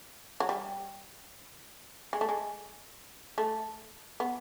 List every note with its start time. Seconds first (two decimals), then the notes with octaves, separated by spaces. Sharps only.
0.40 F#3
0.49 G3
2.13 G#3
2.21 A3
2.29 G#3
3.38 A3
4.20 B3